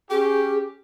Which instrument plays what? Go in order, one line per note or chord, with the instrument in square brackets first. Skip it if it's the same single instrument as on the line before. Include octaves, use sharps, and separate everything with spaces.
[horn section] C#4 G4 [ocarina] G#4